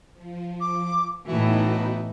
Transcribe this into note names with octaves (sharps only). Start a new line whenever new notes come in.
F3
D6
A2 E3 B3 D#4 F#4